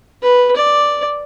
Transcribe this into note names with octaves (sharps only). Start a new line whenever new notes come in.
B4
D5